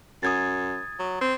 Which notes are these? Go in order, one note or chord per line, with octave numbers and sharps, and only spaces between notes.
F#2 D#6 G#6 A6
F#3
C4